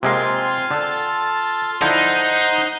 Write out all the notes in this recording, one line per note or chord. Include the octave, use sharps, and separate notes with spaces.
C3 G#3 A#3 C4 F4 G#5 C6
D3 A4 A5
D3 F3 D#4 E4 C5 F#5 C6